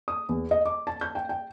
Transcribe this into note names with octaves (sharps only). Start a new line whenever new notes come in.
D#6
E2
D#5
D6
A5
G6
G5
G5